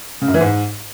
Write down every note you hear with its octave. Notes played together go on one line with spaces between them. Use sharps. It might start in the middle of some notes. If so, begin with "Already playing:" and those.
C#3
F#2
E3
G#2